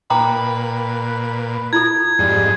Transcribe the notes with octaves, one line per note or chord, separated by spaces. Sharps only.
A#2 B4 G5 A#5 D6
E4 F4 A4 G#6
F2 G#2 G3